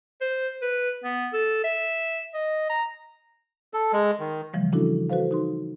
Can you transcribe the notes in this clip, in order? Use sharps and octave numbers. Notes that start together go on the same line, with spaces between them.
C5
B4
B3
A4
E5
D#5
A#5
A4
G#3
D#3
C#3 E3 F3 G3 A3
C#4 D4 E4 F#4 A4
F#4 A4 B4 C5 F5
D#4 F#4 C6